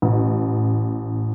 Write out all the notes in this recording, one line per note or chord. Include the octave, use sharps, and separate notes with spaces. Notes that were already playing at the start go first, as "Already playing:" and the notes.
A1